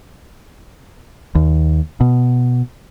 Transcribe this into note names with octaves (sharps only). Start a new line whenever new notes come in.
D#2
B2